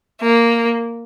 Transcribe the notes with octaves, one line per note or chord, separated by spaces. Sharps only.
A#3